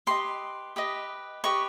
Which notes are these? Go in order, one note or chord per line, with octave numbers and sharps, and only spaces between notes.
G4 B4 D#5 C6
G4 B4 D#5
G4 B4 D#5 C#6